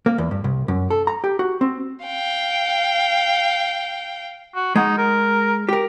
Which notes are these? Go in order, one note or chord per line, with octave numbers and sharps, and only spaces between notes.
A#3
E2
G2
C2
F#2
A4
A#5
G4
F#4
C4
F5 G5
F#4
G#3 D#4 F#5
A#4
G4 A#4